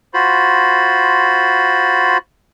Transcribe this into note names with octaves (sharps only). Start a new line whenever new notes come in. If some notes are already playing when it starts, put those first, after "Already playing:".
F4 F#4 C5 B5